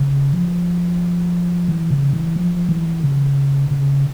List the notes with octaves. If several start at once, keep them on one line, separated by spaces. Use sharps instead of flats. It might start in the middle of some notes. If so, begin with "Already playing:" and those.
Already playing: C#3
F3
E3
C#3
E3
F3
E3
C#3
C#3